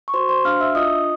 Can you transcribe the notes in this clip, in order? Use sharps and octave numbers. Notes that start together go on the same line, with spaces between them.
C#6
F#4 C5 C6
C5 C6
D4 F5 F6
E5 E6
F4 D#5 D#6